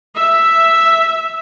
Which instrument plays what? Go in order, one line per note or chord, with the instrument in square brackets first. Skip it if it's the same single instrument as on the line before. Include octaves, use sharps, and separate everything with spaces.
[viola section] E5